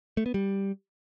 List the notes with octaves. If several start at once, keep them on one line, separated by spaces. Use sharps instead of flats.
A3
B3
G3